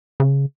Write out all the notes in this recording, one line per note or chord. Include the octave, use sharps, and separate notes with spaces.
C#3